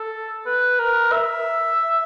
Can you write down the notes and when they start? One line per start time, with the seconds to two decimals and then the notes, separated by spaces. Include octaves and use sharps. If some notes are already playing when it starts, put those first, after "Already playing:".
Already playing: A4
0.46 B4
0.79 A#4
1.12 E5